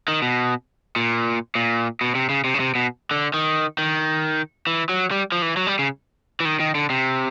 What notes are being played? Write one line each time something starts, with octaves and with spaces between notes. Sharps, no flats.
D#3
B2
A#2
A#2
B2
C3
C#3
C3
C#3
C3
B2
D3
D#3
D#3
E3
F#3
G3
F3
E3
F#3
G3
C#3
E3
D#3
D#3
D3
C3